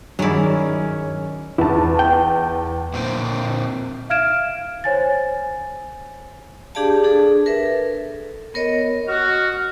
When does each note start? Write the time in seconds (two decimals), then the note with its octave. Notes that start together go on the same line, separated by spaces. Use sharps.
0.19 G2 D#3 F#3 C#4 E4 G#4 C#5 D5
1.58 E2 E4 A5
1.99 G5
2.93 A#2 D3 A#3 C4 C5 G5
4.10 E5 F5 F6 G#6 D7 E7
4.84 C5 C#5 G#5 A6
6.75 D4 G4 G#4 D5 F5 A5
7.04 D4 G#4 A4
7.46 A#4 B4 E5
7.66 A4
8.54 B3 A#4 C#5 D#5
9.08 F#4 D#5 F#5 F6